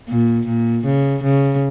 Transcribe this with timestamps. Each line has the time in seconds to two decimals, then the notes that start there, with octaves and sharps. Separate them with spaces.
0.09 A#2
0.47 A#2
0.85 C#3
1.23 C#3